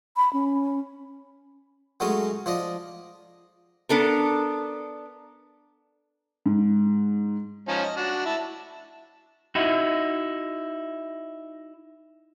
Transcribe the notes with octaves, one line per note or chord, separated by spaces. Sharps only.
B5
C#4
F#3 G#3 A3 C#4 D#4
F3 D4 D#5
B3 D4 A4 A#4
G#2
F3 C#4 D#4
D#5
D4 F#4
E4 A5
D#4 E4 F#4